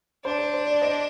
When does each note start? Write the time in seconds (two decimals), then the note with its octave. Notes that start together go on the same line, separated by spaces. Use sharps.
0.25 D4 C5
0.39 C5
0.54 C5
0.67 D5
0.82 C5 D#5